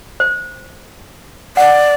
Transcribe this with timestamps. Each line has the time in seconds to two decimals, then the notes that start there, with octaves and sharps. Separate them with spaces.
0.20 C5
1.57 D5 F#5